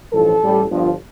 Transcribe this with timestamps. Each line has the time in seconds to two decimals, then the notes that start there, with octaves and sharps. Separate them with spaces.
0.12 A1 G2 F3 A4
0.41 A1 A2 G3
0.70 G1 G2 F3